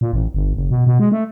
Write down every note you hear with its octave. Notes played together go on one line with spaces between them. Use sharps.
A#2
A1
G1
F#1
B2
B2
G#3
A3